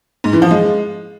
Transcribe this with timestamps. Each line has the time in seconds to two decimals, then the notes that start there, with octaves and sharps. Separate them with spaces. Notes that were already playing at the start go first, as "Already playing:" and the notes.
0.24 G#2
0.33 E3
0.42 F3
0.51 G#3